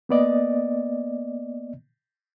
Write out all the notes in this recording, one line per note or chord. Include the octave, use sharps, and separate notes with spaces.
A#3 B3 D5 D#5